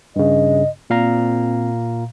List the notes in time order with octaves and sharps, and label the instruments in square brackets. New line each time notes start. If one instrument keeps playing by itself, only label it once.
[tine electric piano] G2 C#3 [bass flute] D#5
[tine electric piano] A#2 F5 A#5 [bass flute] C4